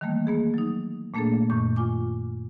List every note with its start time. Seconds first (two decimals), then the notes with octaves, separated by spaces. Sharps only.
0.01 D#3 E3 G3 A3 A#3
0.27 A#3 B3 G#4
0.54 F#3 D#4
1.14 A#2 A3 A#3 D4 G#4 A4
1.50 F#2 A#2 D#3 C#6 G6
1.76 F4 G#5 D6